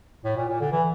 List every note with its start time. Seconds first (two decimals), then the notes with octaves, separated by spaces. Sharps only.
0.24 A2
0.37 A#2
0.49 A#2
0.60 D3
0.72 E3